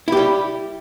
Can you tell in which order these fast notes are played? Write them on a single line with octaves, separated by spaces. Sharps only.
E4 G4 G3